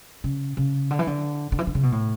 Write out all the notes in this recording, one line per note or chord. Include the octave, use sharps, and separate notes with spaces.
C#3
C#3
D3
E3
D3
D3
E3
D3
C#3
B2
A2